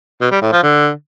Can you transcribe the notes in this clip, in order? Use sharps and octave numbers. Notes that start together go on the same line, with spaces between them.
B2
G3
A2
F3
D3